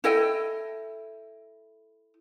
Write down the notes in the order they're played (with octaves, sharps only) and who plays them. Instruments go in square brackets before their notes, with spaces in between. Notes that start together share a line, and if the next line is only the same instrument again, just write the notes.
[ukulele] E4 A4 D#5 G5